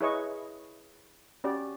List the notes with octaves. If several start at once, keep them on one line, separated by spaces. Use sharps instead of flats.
E4 G#4 B4 C#5 D#5 C#6
C#4 F#4 G4 D5